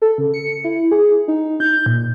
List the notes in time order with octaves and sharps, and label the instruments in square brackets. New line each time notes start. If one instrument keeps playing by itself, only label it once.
[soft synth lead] A4
C#3
C#7
E4
G#4
D#4
G6
A#2